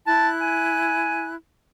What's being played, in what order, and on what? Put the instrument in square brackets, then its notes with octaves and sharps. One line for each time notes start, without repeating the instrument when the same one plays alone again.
[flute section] E4 F#6 [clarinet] A5
[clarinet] G#5